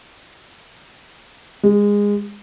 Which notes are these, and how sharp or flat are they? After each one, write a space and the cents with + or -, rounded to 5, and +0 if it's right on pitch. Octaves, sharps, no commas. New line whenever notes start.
G#3 -20